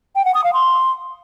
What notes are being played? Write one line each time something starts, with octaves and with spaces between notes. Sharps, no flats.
G5
F#5
D#6
F5
C6